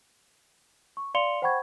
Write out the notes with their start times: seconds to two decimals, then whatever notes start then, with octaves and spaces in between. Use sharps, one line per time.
0.97 C#6
1.14 D5 F5 C6 C#7 F7 G7
1.42 C5 F#5 G5 B5 C#6 G#6